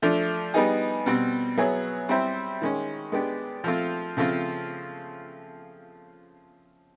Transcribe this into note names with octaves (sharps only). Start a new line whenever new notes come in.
F3 A3 D4
G3 B3 D#4 G#4
B2 G3 C4
F#3 B3 E4 G#4 C#5
G3 C4 E4 G4 C5
D#3 G#3 C#4
G#3 B3 D4 G4
F3 A3 C4 F4
C#3 F3 A3 C4 F4